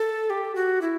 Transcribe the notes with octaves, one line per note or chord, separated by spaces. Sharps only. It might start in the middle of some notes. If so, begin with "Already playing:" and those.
Already playing: A4
G4
F#4
E4